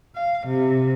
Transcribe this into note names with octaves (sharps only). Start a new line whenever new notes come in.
F5
C3